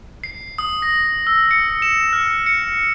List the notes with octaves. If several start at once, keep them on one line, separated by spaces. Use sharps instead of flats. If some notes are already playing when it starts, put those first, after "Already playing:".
C7
D#6
A#6
E6
C#7
E7
F6
C#7